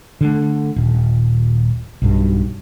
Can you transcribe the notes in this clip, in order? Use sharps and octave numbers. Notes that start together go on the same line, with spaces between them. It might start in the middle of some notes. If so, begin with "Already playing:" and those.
D3 A3
D#1
B1 G2